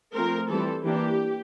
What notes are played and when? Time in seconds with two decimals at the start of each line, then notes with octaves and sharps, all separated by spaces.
0.14 F3 A3 C4 A#4
0.50 E3 G3 C4 A4
0.85 E3 A#3 D4 G4